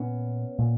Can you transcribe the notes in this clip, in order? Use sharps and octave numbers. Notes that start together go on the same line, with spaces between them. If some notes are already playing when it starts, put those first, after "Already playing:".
Already playing: A#2 B3 C#4
A#2